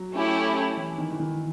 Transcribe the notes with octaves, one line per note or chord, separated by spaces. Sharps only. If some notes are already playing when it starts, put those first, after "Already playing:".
Already playing: F#3
A3 C#4 E4 G4
E3
D#3
E3
D#3